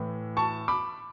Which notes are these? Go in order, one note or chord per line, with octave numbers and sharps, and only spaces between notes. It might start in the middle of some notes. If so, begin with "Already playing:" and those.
Already playing: A2 E3
A5 C#6
B5 D6